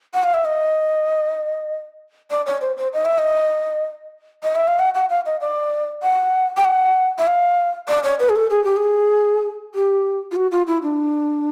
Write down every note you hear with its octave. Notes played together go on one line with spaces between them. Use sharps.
F#5
F5
E5
D#5
D5
C#5
C5
C5
D#5
E5
D#5
D#5
E5
F5
F#5
F#5
F5
D#5
D5
F#5
G5
F#5
E5
F5
D5
C#5
B4
G#4
A4
G#4
G4
G#4
G4
F4
F#4
F4
E4
D4